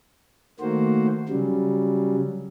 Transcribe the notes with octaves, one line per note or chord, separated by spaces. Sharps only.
D#3 A3 A#3 F#4 C5
C#3 F#3 G3